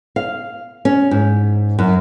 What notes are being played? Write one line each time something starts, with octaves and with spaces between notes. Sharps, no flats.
F5
C#4
G#2
F#2